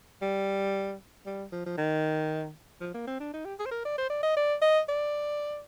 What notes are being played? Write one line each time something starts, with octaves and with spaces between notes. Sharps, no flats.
G3
G3
F3
F3
D#3
F3
A#3
C4
D4
D#4
G4
G#4
C5
A#4
D5
C5
D5
D#5
D5
D#5
D5